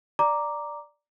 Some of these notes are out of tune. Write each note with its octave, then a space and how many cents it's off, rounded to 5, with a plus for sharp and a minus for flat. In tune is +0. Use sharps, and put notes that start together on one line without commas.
D5 +0 A#5 +0 D6 +0